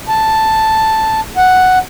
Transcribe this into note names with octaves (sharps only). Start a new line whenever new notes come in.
A5
F#5